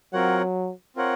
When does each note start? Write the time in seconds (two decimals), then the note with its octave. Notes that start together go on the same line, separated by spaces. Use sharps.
0.13 F#3 C4 F4 A#4 C#5 F#5
0.96 C4 F4 A#4 C#5 F#5